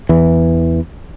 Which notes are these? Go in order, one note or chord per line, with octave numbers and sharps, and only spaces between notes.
E2 E3